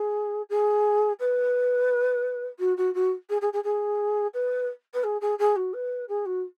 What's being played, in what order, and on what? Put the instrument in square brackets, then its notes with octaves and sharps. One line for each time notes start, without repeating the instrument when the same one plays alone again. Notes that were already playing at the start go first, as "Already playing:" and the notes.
Already playing: [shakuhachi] G#4
G#4
B4
F#4
F#4
F#4
G#4
G#4
G#4
G#4
B4
B4
G#4
G#4
G#4
F#4
B4
G#4
F#4